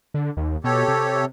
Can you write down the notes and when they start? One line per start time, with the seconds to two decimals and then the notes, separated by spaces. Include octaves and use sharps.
0.14 D3
0.37 D#2
0.64 B2 G4 A4 C#5
0.88 C3